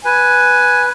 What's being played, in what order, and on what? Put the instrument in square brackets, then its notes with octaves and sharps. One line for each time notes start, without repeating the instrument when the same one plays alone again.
[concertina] B4 [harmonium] G#5